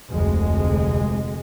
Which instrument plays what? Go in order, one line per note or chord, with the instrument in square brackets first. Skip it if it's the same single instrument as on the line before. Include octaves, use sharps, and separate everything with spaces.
[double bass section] F1 D2 G#3